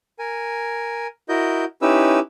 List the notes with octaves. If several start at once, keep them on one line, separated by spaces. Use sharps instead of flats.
A#4 G#5
E4 F#4 A#4 D#5 G6
C#4 D#4 E4 G4 B4 E6